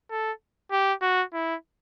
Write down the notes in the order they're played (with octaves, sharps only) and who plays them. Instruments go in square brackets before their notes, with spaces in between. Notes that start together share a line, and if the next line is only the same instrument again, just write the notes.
[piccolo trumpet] A4
G4
F#4
E4